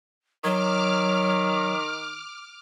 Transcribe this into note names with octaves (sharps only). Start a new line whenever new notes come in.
D#3 F#3 D6 F6